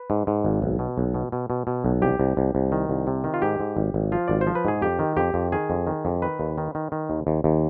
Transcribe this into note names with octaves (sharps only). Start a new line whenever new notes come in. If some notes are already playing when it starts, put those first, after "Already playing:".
Already playing: B4
G#2
G#2
G#1
B1
B2
B1
B2
B2
B2
B2
B1
C2 G4
C2
C2
C2
D#3
C2
C3
D#3
F4
G#2 G4
G#2
G#1
G#1
F3 F4
G#1 D5
C5
F3
B4
G#2 G#4
F2 G4
D#3
F2 G4
F2
D#3 G#4
F2
D#3
F2
D#3 B4
D#2
D#3
D#3
D#3
D#2
D#2
D#2